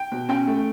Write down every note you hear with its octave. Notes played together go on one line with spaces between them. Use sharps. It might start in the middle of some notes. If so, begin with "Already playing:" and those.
Already playing: G5
B2
C#4 G5
A3